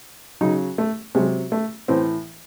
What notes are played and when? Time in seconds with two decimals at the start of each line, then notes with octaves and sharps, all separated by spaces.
0.41 C#3 F#3 D#4
0.78 A3
1.15 C3 F#3 G#3
1.52 A3
1.88 A2 E3 C4